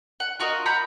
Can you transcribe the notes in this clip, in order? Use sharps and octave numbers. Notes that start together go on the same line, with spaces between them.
F#5
F4 F#4 A#4 D#5
F#5 A#5 B5 G6